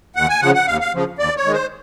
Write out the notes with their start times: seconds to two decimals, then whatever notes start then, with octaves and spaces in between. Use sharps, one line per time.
0.16 D#2 F#5
0.29 G#5
0.42 C#3 F3 F#5
0.55 F#5
0.67 D#2 F5
0.81 F5
0.93 C#3 F3
1.19 D#2 D5
1.37 C#5
1.45 D#3 G#3
1.53 C5